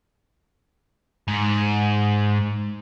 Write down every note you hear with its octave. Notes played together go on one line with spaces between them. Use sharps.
G#2